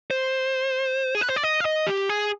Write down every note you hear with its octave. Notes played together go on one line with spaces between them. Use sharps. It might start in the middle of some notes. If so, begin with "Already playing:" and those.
C5
G#4
B4
C5
D5
D#5
F5
D#5
G4
G#4